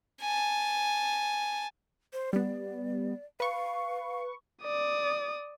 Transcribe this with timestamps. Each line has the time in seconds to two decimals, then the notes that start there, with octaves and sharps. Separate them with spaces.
0.21 G#5 A5
2.13 C5
2.33 G3 B3 D5
3.40 B4 F5 C#6
4.63 D5 D#6